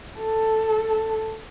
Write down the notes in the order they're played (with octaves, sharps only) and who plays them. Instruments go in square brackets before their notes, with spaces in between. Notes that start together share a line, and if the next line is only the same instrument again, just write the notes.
[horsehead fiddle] A4